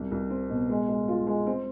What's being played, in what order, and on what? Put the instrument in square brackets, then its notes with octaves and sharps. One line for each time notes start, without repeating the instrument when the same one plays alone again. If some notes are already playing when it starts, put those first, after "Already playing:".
Already playing: [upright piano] C2
C2
C4
B2
G#3
G#3
F4
G#3
C4